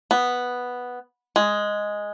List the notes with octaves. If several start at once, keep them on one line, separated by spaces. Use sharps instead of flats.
B3
G#3